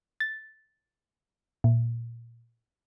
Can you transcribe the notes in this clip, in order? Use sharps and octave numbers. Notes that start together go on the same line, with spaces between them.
A6
A#2